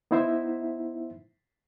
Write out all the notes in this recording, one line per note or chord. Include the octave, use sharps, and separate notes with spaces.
B3 D#4 E4 C5 E5